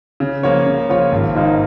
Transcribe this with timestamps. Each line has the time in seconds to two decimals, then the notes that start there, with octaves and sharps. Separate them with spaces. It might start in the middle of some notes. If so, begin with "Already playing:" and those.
0.20 C#3
0.43 F3 A#3 F4 C#5
0.66 C#3
0.89 F3 A#3 F4 C#5
1.12 G#1
1.35 G#2 D#3 A#3 D#4